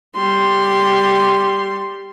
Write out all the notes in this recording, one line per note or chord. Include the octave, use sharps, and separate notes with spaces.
G3 C6